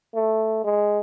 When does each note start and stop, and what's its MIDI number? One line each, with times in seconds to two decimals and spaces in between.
0.14 0.61 57
0.64 1.00 56